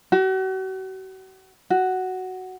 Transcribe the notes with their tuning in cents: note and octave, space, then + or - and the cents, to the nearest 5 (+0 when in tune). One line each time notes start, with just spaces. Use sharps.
F#4 +40
F#4 +5